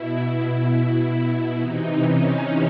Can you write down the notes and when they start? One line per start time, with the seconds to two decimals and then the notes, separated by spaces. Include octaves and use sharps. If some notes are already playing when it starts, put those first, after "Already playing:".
Already playing: B2 E4
0.23 E4
1.58 C3 E3 D#4
2.03 C#4